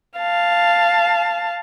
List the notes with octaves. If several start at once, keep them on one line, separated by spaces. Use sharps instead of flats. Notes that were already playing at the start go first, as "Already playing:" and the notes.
F5 A5